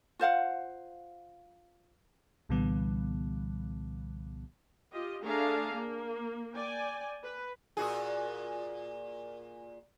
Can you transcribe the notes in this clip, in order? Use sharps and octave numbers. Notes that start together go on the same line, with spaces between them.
F4 C5 F5 F#5
C2 A#2 D3 E3 G3 B3
F4 G4 D#5
A3 D4 G#4 F5 A#5
A#3
D5 G5 G#5
B4
A#2 F#4 G#4